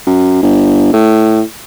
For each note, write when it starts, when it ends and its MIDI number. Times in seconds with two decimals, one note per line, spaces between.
0.07 0.41 42
0.43 0.89 31
0.93 1.42 45